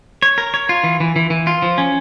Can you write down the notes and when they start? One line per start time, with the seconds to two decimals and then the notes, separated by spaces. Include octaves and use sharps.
0.22 C#5
0.38 A#4
0.54 C#5
0.69 F4
0.84 E3
1.00 E3
1.16 E3
1.30 E3
1.47 F4
1.62 F3
1.78 C#4